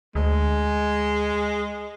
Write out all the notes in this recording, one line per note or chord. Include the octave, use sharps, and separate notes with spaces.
D2 G#3